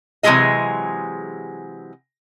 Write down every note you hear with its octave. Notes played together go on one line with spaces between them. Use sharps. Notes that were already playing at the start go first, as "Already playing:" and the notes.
C3 E3 F#3 G#3 G#4 D#5